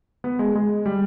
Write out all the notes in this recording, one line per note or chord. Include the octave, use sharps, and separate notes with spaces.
B3
G#3
G#3
G3